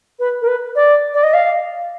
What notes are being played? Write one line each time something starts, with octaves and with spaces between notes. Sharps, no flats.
B4
A#4
B4
D5
D5
D#5
F5